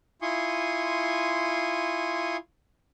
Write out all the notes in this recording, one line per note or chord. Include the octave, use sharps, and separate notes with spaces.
E4 F4 G#5 C6 C#6 D#6